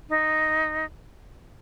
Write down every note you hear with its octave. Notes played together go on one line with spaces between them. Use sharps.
D#4